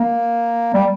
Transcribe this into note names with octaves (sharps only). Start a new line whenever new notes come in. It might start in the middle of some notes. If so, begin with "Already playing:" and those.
Already playing: A#3
G3